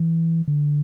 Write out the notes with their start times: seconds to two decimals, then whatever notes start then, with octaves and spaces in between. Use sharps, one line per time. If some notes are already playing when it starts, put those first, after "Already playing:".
Already playing: E3
0.48 D3